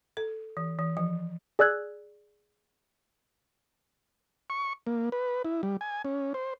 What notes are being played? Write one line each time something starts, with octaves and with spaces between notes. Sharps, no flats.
A4
E3
E3
F3
G#4 D5 E6 F#6 G#6
C#6
A#3
B4
E4
G3
G#5
C#4
C5